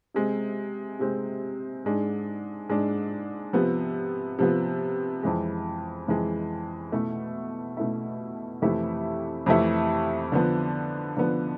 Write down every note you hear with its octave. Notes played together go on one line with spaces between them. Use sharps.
C3 G#3 C4
C3 G#3 C4
G#2 G#3 D4
G#2 G#3 D4
C3 F3 B3
C3 F3 B3
F2 E3 G#3
F2 E3 G#3
B2 A3 E4
B2 A3 E4
F2 C3 E3 A3 E4
F2 C3 E3 A3 E4
D3 F3 B3
D3 F3 B3